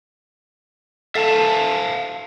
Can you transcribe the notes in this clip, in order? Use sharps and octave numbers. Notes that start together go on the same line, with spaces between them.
A4 E5 F5 A5